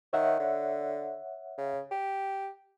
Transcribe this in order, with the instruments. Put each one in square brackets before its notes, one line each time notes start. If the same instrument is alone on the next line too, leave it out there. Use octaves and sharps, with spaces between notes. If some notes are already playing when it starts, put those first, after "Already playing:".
[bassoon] D#3 [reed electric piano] C#5 E5 F#5
[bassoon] D3
C#3
G4